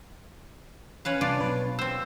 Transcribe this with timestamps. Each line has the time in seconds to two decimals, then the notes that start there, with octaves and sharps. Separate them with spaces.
1.05 C#4 B4 F5
1.21 C2 D4 F4 D6
1.40 B1 B4 C#5
1.79 C4 C5 E6